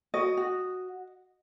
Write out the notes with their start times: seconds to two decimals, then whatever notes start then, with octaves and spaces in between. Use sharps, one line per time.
0.14 F#4 D#5
0.37 F#4